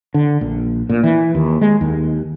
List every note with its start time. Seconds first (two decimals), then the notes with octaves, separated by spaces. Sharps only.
0.14 D3
0.41 A#1
0.89 A#2
1.04 E3
1.35 D#2
1.61 G#3
1.81 D#2